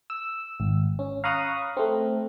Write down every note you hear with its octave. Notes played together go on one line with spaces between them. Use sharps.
E6
G#1
C#4
F5 A#5 B5 C#6 D#6 F#6
A3 C4